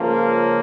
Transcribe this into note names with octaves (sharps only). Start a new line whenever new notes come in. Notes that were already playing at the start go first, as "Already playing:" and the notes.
Already playing: C#2 C#3 F3 A#3